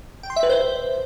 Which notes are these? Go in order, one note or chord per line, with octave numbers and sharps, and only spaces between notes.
G5
C6
E5
B4
C5